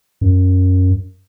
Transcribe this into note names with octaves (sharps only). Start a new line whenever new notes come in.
F#2